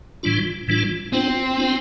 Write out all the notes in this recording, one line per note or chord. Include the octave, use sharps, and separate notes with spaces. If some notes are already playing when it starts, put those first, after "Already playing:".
A2 E3 G3 D4 F4
A2 E3 G3 D4 F4
B3 C4 D4 F4 C5
B3 D4 F4 C5